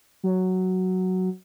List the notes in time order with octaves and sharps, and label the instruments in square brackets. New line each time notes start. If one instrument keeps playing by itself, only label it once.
[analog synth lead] F#3